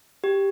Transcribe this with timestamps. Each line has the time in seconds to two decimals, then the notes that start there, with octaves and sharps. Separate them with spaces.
0.24 G4